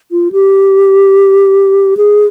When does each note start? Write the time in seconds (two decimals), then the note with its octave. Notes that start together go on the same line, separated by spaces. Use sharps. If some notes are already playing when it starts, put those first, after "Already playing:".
0.12 F4
0.32 G4
1.97 G#4